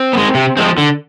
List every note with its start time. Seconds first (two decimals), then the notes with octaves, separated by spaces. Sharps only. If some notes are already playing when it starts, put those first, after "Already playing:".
Already playing: C4
0.13 B3
0.17 G#3
0.35 C3
0.57 F3 G#3 C4
0.78 D3